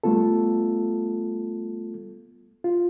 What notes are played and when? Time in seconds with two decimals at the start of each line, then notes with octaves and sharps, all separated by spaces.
0.04 G3 A3 B3 F4 A4
2.64 F4